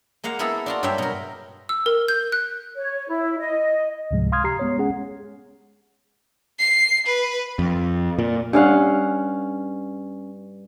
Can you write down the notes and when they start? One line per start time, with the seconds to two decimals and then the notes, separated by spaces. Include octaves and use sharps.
0.24 G#3 A#3 F5 F#5
0.39 A#3 B3 E4 G#4 A4
0.66 D4 F4 F#4
0.83 G2 F#3 D4 E5 G5
0.98 B2 A#4
1.69 E6
1.86 A#4
2.08 G6
2.32 F#6
2.76 C#5
3.09 E4
3.39 D#5
4.11 C#2 G#2 C3 F3 G#3
4.32 F5 C6 D#6 F6 G#6
4.44 G4 A#5 C7
4.59 G#3 B3 C#5
4.77 G#3 C#4 G#4 F#5
6.59 C7
7.06 B4
7.59 F2
8.19 A#2
8.53 G2 C#4 F5 F#5